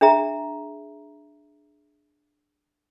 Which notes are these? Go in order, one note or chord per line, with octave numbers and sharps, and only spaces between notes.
D4 G#4 E5 A#5